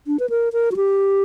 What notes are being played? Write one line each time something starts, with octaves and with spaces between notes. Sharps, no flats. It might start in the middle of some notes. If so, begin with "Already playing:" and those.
D4
B4
A#4
A#4
F#4
G4